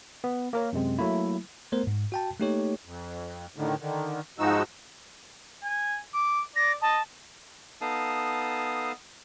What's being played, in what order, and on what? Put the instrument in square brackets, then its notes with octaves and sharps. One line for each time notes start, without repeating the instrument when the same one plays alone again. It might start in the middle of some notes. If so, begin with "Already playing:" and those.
[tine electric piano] B3
A#3 A#4 C#5
F#2 C3 G#3 C4
F#3 A3 A#3 E4
A3 B3 A#4 C5
G#2
F#4 G5 A5
A3 A#3 D#4 G4 A4 C#5
[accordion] F2
A2 D3 D#3
D3 D#3
G#2 F3 G#3 D#4 F#4 E6
[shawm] G#5
D6
[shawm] D5 [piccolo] A#6
[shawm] D#5 [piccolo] A5
[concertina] B3 D#4 A4 F5 A5 D#6